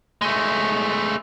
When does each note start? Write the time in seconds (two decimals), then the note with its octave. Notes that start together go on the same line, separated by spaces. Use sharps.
0.22 G#3 A3